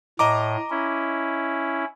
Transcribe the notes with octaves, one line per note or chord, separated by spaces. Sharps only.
A2 D#5 A#5 D6
C#4 E4